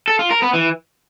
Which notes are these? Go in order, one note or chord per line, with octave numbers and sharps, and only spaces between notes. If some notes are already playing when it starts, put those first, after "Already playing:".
A4
F4
A#4
B3
E3